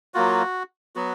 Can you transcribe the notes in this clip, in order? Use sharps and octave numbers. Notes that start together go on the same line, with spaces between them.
F#3 A#3 F4 F#4
F#3 B3 F#4